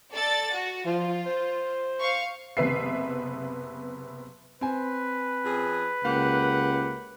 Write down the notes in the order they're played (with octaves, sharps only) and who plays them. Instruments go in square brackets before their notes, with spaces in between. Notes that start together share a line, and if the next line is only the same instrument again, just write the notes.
[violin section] A4 D5 A6
F#4
[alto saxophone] F3 [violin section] F4
[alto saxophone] C5
[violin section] F5 C#6
[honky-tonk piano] F#1 C3 B3 B4 E5 C7
[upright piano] C4 G#5 [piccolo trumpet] B4
[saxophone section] F2 C#4 G#4
[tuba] C#2 [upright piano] A#3 [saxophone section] G4 F#5